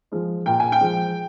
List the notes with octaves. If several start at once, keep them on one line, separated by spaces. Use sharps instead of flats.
F3 G#3
A#2 G5
G#5
G5
F3 G#3